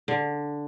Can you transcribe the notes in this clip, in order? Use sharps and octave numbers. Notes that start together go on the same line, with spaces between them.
D3